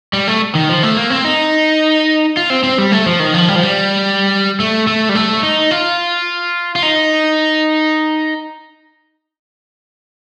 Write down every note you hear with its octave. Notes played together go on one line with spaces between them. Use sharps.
G3
A3
D#3
F3
A3
A#3
C4
D#4
F4
C4
C4
G3
A3
F3
D#3
F3
G3
F3
G3
A3
A3
G3
A3
D#4
F4
F4
D#4